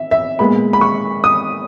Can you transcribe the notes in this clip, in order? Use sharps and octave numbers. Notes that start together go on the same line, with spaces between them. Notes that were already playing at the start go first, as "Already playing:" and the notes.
Already playing: E5
E5
A#2 G#3 B3 B5
B5
C#6
D#6